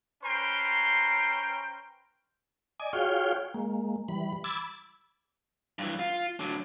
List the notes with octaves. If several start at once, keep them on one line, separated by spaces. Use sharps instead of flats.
C#4 B4 C5 G5 A#5 C6
D5 D#5 G#5
F4 F#4 G#4 C#5 F5 G5
G#3 A#3
E3 G3 B5
B5 D6 E6 G#6 A6
G2 E3
F4
D3 F#3